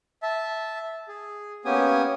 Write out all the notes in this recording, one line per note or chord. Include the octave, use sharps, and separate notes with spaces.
E5 A5
G#4
A#3 B3 C#4 G4 G#5 D#6